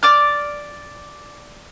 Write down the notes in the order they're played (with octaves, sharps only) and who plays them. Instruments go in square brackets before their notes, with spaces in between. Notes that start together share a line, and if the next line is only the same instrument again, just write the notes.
[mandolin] D5 D6 F6